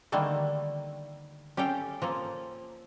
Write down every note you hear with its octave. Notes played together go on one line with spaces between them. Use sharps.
D3 D#3 G3 A3 A#3
C#4 G4 A4 F5 G5
F3 A#3 A4